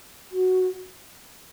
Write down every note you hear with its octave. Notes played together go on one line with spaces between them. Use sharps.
F#4